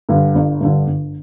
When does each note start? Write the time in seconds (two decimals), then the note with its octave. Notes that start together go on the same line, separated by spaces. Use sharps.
0.09 G2 D3
0.35 G1
0.61 G2 D3
0.87 G1